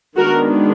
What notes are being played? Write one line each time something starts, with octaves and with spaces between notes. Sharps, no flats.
D#3 G#3 B3 D4 F#4 A#4